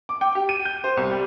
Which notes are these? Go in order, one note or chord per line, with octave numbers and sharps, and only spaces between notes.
D6
G5
G4
D#7
G6
C5
C2
G3